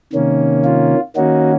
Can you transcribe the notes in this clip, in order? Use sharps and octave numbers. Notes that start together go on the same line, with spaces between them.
C3 D#3 A#3 C#4
F4
D#3 A#3 C#4 D#4 F#4